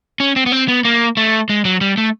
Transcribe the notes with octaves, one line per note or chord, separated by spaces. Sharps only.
C#4
C4
B3
C4
B3
A#3
A3
G#3
F#3
G3
A3